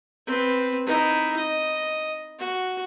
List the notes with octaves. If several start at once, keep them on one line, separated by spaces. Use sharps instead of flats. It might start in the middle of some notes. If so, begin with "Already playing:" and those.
C4 B4
D#4 E4
D#5
F#4